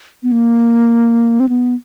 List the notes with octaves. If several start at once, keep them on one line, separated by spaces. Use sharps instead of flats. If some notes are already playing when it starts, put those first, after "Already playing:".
B3
A#3
C4
B3